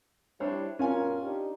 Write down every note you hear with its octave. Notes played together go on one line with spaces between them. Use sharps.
G3 D4 E4 C5 C#5
G2 B2 C#4 F4 A#4 G#5
D4 D#4 G4